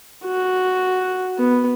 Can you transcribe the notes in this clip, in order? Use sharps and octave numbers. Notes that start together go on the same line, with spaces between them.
F#4
B3